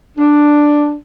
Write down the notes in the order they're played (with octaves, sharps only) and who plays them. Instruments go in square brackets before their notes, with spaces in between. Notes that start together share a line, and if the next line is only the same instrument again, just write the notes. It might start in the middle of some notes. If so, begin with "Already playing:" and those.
[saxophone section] D4